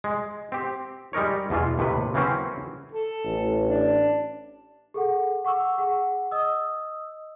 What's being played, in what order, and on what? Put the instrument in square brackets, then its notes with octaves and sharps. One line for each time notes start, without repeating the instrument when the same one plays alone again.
[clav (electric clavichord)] G#3
C4 G4
G3 G#3 D#4 A#4 C#5
E2 B2 E3 F4
D#2 A2 C3 B4
C#3 E3 F#3 A#3 C4 C#4
[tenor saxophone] A4
[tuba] A1
[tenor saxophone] D4
[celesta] G#4 A4 F#5
F#5 C#6 D6 E6
G#4 F#5
D#5 D#6 E6